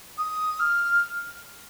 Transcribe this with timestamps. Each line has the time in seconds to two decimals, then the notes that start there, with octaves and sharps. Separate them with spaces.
0.17 D#6
0.59 F6